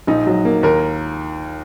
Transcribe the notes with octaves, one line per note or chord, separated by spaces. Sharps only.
A#1 D#4
F#3
A#3
D#2 A#4